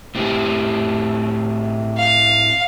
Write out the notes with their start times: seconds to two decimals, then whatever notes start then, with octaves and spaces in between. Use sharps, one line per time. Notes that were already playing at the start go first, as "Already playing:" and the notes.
0.15 A2 C4 G4
1.97 F5